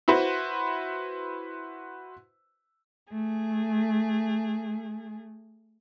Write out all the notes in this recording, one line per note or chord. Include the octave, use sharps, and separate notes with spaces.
E4 F#4 B4 C5
A3 G#4